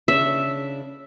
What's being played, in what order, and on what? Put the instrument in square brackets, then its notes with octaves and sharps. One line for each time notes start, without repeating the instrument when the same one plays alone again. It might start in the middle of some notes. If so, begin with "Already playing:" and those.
[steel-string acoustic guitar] C#3 D4 E4 [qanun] E5